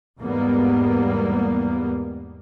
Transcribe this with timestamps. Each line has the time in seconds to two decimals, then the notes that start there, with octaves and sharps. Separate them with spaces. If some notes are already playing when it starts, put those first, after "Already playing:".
0.19 E2 G#2 G3 A#3 B3